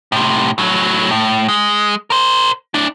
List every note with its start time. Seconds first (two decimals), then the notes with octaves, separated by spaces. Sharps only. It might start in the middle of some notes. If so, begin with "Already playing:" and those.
0.12 A2 C3
0.58 A2 F#3
1.11 A2
1.48 G#3
2.10 A#4 C5
2.74 D4 E4